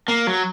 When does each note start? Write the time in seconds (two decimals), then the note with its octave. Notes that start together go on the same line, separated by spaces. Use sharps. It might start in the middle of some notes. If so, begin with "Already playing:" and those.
0.08 A#3
0.27 F#3